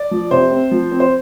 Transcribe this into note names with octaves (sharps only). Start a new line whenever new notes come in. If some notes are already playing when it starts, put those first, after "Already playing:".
Already playing: D5
F3
C3 C5
C4
F3
C4
C5